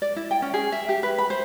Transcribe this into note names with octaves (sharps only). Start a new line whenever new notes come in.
D5
E4
G5
C#4
G#4
E5
G4
B4
B5
C5